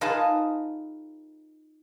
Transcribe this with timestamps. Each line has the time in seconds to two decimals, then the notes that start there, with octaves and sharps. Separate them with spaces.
0.01 D#4 F4 G#4 B4 A5